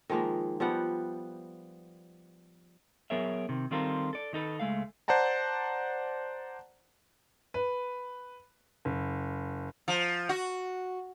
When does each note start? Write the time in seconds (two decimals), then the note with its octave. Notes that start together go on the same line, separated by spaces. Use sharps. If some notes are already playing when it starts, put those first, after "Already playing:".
0.09 D#3 F3 G#3 A#3
0.60 F3 G3 B3 F#5
3.10 F#3 B3 G#4 A#4 C#5 E5
3.49 C3 D#3
3.71 D#3 G3 C4 F4 A4 A#4
4.13 A4 D5
4.33 D#3 D#4 A4 B4
4.60 C#2 G#3 A3 F5
5.08 C5 D5 F#5 A5 A#5
7.54 B4
8.85 F#1
9.88 F3
10.29 F#4